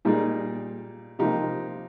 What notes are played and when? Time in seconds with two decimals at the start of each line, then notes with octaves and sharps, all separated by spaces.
0.05 A#2 G3 A#3 D#4 G#4
1.19 C3 F3 A#3 D#4 G4